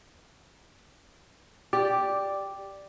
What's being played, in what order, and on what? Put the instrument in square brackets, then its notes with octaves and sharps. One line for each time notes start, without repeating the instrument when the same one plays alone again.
[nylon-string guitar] G4 [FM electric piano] D5